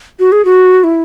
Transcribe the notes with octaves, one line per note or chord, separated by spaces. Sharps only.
F#4
G#4
F#4
E4